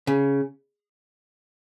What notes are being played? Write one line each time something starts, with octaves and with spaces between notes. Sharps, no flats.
C#3